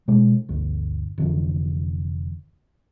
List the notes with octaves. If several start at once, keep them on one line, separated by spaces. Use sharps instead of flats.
B2 G#3
G1 D2
F1 D3 E3